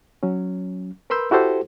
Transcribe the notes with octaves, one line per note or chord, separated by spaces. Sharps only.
F#3 C#4
A#4 B4 B5 C6 E6 G6
E4 F#4 G4 A4 C5